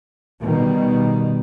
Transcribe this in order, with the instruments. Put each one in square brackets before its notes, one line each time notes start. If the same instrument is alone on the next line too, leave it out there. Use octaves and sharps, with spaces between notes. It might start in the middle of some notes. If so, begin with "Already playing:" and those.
[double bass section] B2 D#3 G3